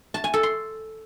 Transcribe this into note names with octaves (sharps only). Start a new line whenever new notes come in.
A5
G#5
A4
C6